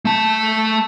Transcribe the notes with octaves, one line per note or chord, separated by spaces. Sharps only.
A3 A5